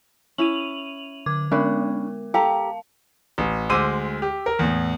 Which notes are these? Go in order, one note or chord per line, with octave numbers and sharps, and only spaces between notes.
C#4 E4 D#7 F7 F#7
D3 D6 G#6
G#3 B3 C#4 D4 A#4 B5
G4 A4 F5 A5 A#5
A1
D2 G#3 C5 D6 E6 D#7
G4
A#4
E2 A2